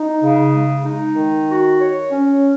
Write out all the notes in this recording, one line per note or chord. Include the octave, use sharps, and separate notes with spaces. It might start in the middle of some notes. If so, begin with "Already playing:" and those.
Already playing: D#4
C#3
G#3
D#4
D#3
F#4
C#5
C#4